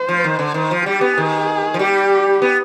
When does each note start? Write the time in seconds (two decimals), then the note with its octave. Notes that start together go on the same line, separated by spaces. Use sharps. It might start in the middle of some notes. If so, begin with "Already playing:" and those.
Already playing: C5
0.08 F3
0.24 D#3
0.39 D3
0.54 D#3 C5
0.71 F3
0.86 G3 G4
1.01 B3
1.17 D#3 G#4
1.74 F3
1.79 G3 G4
2.42 B3